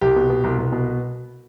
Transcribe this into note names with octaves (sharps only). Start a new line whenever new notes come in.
C2 G4
B2
B2
C2
C2
B2